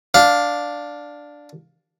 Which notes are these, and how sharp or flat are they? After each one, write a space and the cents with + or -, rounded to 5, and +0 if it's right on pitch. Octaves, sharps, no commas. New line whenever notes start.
D4 +0 F5 +15